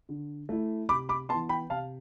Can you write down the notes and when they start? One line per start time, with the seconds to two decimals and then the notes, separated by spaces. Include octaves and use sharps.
0.09 D3
0.49 A3 E4
0.89 C3 B5 D6
1.09 B5 D6
1.29 B3 A5 C6
1.34 E3
1.49 G5 B5
1.70 C3 F5 A5